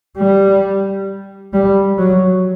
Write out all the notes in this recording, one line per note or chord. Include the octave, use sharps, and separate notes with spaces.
G3
G3
F#3